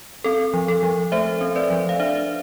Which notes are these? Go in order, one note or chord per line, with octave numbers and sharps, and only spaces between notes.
C4 A4
F3
A4
F3
A3 C5 E5
C4
B4 D5
F3
F5
D4 C5 E5